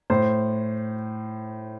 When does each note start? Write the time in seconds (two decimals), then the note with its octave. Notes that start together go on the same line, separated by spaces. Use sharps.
0.10 A2 C5